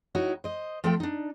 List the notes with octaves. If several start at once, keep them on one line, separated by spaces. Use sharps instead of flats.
D#4 E4 F#4 C#5
C5 D#5
F3 A3 C4 F4 A4 G5
D4 D#4